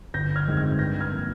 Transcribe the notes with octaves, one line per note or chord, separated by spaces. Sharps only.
G1 G6 A#6
F6 G#6
F2 D#3 G#3 C4
F6 G#6
G2 G6 A#6
F6 G#6
F3 A#3